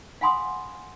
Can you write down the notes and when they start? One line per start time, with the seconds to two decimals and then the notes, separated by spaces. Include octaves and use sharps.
0.21 F5 F#5 G#5 B5 C6 D#6